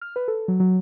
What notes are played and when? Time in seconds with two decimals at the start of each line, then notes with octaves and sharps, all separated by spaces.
0.01 F6
0.16 B4
0.28 A4
0.48 F#3
0.60 F#3